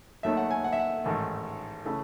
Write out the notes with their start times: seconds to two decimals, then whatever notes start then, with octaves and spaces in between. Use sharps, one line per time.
0.23 D#2 D#3 F#3 A3 E5
0.37 F#5
0.51 G#5
0.64 F#5
0.73 E5
0.80 F#5
1.04 A1 G#2 D#3 A3
1.85 C#3 E3 A3